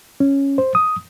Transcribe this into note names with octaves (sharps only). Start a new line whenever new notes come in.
C#4
C5
D#6